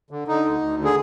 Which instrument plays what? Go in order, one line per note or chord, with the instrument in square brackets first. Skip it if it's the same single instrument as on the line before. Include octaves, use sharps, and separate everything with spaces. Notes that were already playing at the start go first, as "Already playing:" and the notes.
[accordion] D3
D3 D#4
D2
D2
D3
G#4